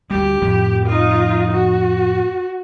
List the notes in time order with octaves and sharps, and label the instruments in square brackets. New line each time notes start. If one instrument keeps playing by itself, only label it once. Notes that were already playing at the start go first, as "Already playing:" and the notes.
[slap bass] D2 G3 [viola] G4
[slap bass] F2 A2 F3
[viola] D#4 F4
F#4